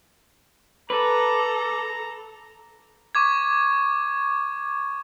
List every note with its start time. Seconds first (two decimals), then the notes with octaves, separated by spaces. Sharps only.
0.90 A4 B4 A#5 D6
3.15 C#6 D6 G#6